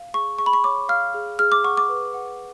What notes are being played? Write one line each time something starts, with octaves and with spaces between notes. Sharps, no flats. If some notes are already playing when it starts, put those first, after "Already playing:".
Already playing: F5
G#4 C#6
G#4 C#6
B5
C#6
C#5 D6
F5 F6
G#4
G#4 F6
D6
F#5 C#6
D6
B4
F#5